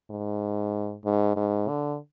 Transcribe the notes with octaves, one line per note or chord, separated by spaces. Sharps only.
G#2
G#2
G#2
D3